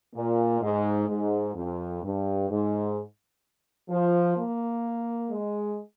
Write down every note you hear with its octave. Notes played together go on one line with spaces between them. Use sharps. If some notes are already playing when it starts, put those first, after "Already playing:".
A#2
G#2
G#2
F2
G2
G#2
F3
A#3
G#3